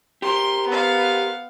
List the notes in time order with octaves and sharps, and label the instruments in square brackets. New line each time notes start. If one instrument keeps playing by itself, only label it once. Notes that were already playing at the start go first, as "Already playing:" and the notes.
[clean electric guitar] G4 A#4 C5 [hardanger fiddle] C6
[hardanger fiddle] B3 F5